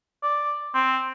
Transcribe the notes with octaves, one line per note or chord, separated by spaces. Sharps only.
D5
C4